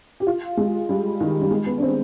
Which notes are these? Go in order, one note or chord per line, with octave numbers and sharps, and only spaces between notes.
G4
F4
G#3
G3
D#3
G3
G#3
B3
D4
C4